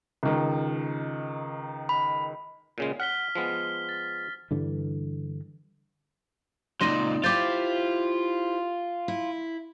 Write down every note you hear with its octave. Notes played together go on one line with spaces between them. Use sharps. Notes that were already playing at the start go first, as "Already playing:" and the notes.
C#2 D#3
B5
A#2 C#3 G#3
F#5 F6 B6 G7
F3 G#3 B3
A6
G2 D3 E3
C#2 A#2 C4 D#4 D5 C6 A#6 D#7
E4 F4 G4 C5 D6 G6 A6
E4